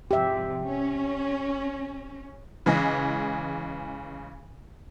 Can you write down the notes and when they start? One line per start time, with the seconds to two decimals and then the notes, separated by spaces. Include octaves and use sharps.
0.11 G#2 C3 F3 G4 E5
0.65 C#4
2.66 C#3 E3 G#3